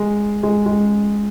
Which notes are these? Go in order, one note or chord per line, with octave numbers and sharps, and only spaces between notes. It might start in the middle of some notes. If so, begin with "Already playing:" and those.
Already playing: G#3
G#3
G#3